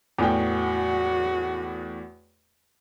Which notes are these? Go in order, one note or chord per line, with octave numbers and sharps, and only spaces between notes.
E2 A2 F#4 G5